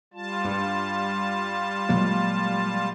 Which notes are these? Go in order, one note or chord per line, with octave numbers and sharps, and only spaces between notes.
G3 F4 A5
G2
A#2 F#3 G#3